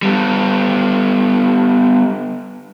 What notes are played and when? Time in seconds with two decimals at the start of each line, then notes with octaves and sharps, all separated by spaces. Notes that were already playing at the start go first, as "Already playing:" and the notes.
0.02 G3 B3